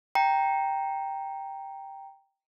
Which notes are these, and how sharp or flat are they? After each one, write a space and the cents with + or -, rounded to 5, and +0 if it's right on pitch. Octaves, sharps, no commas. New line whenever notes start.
G5 +0 A#5 +0